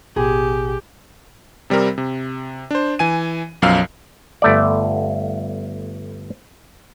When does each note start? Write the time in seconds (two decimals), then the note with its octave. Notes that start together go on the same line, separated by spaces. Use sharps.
0.16 A1 B2 G4 G#4
1.70 C3 G3 C4 A#4
1.98 C3
2.71 D4 C5
2.99 E3 G#5 D#7
3.62 B1 F#2 F3 F5 E6 C7
4.42 G1 A3 D5